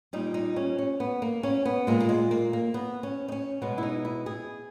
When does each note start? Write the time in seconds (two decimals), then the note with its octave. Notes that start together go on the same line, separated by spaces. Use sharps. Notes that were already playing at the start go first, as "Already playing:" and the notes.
0.13 A#2 G3 D#4
0.34 D#4
0.56 C#4
0.78 C#4
1.00 B3
1.22 A#3
1.43 C#4
1.65 B3
1.87 A#2 G#3 A#3
2.00 A#3
2.09 G#3
2.31 A#3
2.53 A#3
2.74 B3
3.03 C#4
3.28 D#4
3.32 C#4
3.62 B2 G#3 B3
3.78 E4
3.83 D#4
4.05 E4
4.26 G#4